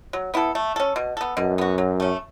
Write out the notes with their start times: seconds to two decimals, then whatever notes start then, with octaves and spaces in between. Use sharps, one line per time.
0.13 F#3
0.34 B3 E4 A4
0.55 A3
0.76 C#4 A4
0.96 B2
1.17 B3 A4
1.37 F#2 B2
1.58 B3 F#4
1.78 F#3
2.00 A3 C#4